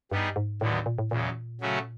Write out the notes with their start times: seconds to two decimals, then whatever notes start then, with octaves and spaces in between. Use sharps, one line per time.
0.11 G2 G3 B3 D#4 G#4
0.36 G#2
0.61 D#2 A2 D3 F#3 B3
0.86 A#2
0.98 A2
1.11 E2 A#2 C#3 F#3
1.61 C#3 F#3 A3 C#4 F#4